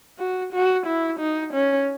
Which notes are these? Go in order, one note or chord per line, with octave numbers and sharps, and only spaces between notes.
F#4
F#4
E4
D#4
C#4